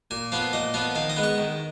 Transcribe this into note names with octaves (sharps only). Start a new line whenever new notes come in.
A#2 G#5
F3 B3 F4 F5
A#2 D#5
F3 B3 F4 F5
D#3 F5
D#5
G#3 B3
C#6
D#3